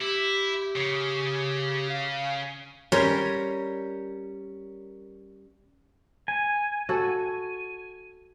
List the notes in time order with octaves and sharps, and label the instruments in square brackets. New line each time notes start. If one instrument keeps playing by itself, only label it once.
[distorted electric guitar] E4 [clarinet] G4
[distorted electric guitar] C#3
[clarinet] F5
[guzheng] G3 C#4 A#4 C#5 C6
[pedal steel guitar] G#5
[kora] F#4 A4